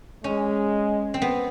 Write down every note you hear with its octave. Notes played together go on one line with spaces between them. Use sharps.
G#3 C#4
C4
B3